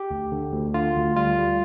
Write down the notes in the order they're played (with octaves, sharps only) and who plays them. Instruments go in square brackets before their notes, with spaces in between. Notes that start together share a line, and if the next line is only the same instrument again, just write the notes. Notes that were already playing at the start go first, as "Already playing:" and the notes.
Already playing: [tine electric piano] G4
D2
D3
D2
D3 F4
D2
G3 F4
G3